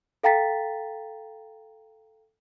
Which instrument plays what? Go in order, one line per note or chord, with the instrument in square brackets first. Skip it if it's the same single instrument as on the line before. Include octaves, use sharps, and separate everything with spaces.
[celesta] A4 F5 G5 A#5 A6 B6